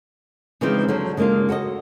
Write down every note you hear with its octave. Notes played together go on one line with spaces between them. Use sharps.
C#3 E3 F3 G#3 C4 D#4
D3 F3 F#3
C#3 G#3 A#3 D4 F4
F#4 A4 B4 D#5